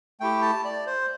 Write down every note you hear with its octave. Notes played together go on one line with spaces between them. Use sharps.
A3 E4 G4 G5
A5
D5
C5